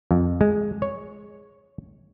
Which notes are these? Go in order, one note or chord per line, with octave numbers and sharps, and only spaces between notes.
F2
G#3
C#5